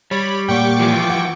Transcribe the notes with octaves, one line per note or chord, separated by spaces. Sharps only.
G3 C#5 B5
A#2 A#3 F#5 G5 C#6 D6
E3 F3
F#5